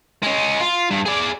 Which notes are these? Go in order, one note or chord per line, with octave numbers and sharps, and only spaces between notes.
G#3 C#4
F4
G2
G#4 D5